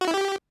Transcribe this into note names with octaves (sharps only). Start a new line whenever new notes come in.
F#4
E4
G4